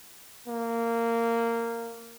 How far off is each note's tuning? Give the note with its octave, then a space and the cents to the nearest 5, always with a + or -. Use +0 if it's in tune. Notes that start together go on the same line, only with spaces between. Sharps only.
A#3 -15